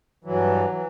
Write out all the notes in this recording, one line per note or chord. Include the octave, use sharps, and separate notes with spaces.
G2 E3 F#3
E3